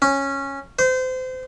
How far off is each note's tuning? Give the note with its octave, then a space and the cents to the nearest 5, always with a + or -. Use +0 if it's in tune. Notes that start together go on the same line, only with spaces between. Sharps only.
C#4 -10
C5 -30